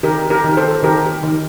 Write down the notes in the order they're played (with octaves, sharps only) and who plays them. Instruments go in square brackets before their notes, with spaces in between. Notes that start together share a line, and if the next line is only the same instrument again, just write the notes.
[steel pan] D#3 G4 A#4
G4 A#4
D#3
A4 C5
D#3 G4 A#4
D#3